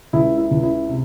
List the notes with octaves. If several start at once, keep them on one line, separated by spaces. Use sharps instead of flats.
C#2 E4
E4
C#2
E4
C3